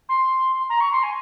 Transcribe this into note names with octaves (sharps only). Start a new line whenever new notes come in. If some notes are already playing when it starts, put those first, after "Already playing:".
C6
A#5
C#6
C6
G#5